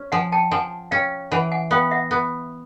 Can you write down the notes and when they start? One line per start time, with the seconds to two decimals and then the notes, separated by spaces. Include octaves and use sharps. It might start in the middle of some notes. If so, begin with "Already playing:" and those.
Already playing: C#4
0.12 F3 F#5 G#5
0.32 G5 A5
0.51 F3 F#5 G#5
0.91 C#4 F5 G5
1.31 E3 F#5 G#5
1.51 F#5 G#5
1.71 B3 F5 G5
1.91 E5 F#5
2.11 B3